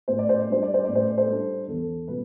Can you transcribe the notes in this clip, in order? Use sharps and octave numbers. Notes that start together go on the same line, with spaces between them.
A2 C5
D5
C5
D5
G3 D4 C5
D5
C5
A2 D5
C5
D5
A4 C5
G3 D4
E2 A4
B2 G3 B4